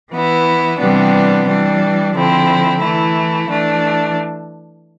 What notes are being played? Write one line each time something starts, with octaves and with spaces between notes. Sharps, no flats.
E3 B3 E4
C3 E3 G3 B3 D4
E3 G3 D4
D3 F3 C4 E4
E3 A3 E4
E3 A3 D4